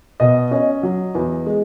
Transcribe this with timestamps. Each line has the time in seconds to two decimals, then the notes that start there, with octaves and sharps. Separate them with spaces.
0.20 B2 D#5
0.51 C#4 D#5
0.83 F#3
1.15 E2
1.46 G#3